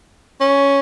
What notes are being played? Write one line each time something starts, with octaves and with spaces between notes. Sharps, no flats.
C#4